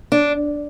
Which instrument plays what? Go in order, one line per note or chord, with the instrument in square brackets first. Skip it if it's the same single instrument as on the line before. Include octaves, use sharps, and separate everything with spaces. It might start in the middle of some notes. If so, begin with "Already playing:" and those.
[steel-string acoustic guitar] D4